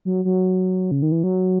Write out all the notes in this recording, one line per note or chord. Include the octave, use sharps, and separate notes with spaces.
F#3
F#3
C#3
D#3
E3
F#3